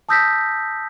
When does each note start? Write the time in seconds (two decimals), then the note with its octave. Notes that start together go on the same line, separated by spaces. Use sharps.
0.09 A5 D#6 E6 G6 A#6 B6